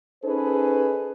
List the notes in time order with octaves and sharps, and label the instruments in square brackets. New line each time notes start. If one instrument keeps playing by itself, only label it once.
[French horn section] C#4 D#4 G#4 A4 B4 C5